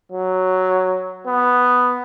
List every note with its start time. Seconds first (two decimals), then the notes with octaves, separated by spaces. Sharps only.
0.12 F#3
1.27 B3